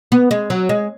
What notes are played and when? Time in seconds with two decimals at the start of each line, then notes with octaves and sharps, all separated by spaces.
0.12 B3
0.31 G#3
0.50 F#3
0.69 G#3